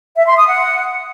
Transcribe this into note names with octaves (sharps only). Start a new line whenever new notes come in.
E5
C6
D#6
F#5